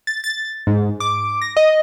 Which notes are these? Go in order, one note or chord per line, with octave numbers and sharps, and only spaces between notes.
A6
A6
G#2
D6
A#6
D#5